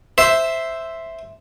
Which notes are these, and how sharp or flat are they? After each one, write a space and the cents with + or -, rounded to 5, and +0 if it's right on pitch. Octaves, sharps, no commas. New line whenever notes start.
C5 +0 E5 +0